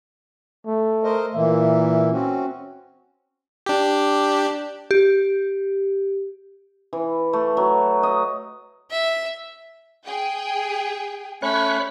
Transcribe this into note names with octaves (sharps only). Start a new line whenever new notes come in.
A3
A#4 C5 D#5
A#2 E3 A#3 E5
C4 C#4 F#4
D4 G4
G4
E3
A3
F#3
D#5
E5
G#4 G5
A3 C#4 C#5 B5 F#6